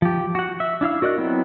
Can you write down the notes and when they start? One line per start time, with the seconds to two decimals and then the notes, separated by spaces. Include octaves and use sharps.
0.02 F3 G4
0.35 F#4 F#5
0.60 E5
0.81 D4 E4 F5 E6
1.02 F#4 A#4 D5 D#5 F#6
1.18 F#3 B3 C4 E4